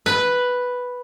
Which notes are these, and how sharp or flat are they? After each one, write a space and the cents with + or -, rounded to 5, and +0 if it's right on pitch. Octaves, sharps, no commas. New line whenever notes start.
B4 +0